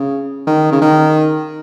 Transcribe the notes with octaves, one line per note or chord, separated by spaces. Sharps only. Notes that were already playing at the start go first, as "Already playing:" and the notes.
Already playing: C#3
D#3
C#3
D#3